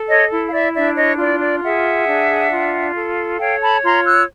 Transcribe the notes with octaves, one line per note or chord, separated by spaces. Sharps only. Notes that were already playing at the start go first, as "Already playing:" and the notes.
Already playing: A4
C#5 D#5
E4
F5
D5 E5
D4 D5 E5
C#5 D#5
F4 D5
D5
G#4 E5 F#5
D4
F4
A4
C#5 F5 G5
A5 B5
F4 A#5 C6
E6 F#6